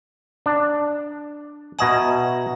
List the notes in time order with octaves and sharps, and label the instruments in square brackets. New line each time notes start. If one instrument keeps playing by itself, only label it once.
[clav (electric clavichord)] D4
[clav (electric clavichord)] B2 D#5 G#5 [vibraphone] E5 F#5 A#5